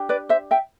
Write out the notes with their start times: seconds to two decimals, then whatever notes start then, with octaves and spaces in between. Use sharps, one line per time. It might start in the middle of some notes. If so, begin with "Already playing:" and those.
Already playing: D4 G4
0.09 B4 D5
0.29 C5 E5
0.51 E5 G5